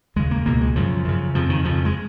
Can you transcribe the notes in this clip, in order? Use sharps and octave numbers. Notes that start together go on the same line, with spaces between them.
D#2 C#3 G#3
A#3
C#2 B2 A#3
G#3
F#2 C#3 F3
F#2 C#3
F2 C#3 F3
D#3
F2 C#3 F3
G#3